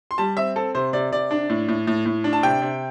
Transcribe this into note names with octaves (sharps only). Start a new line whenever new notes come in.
C6
G3 A5
C4 E5
C4 A4
C3 C5
C3 D5
C3 D5
D4
A2
A2
A2
A2
D4
A5
C3 G5
C3